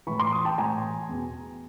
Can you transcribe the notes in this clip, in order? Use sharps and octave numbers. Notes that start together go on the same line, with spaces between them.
A2 E3 B5 C#6
C6 D6
C#6 D#6
G5 A5
A2 E3 G#5 A#5
E2 B2